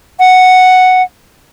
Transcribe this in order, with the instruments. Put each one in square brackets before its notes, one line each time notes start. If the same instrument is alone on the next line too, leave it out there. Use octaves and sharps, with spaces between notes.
[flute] F#5